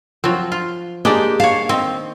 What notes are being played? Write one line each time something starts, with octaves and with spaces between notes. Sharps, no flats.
F3 F#3 C4
F4
G#3 A#3 D4 D#4 G4 D5
C#5 F5 A5
D#3 C4